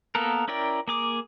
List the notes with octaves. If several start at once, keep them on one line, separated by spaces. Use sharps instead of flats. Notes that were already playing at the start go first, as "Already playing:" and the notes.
A#3 B3 A4 A#4
C#4 E4 A#4 D5 G5
A#3 G#4 D6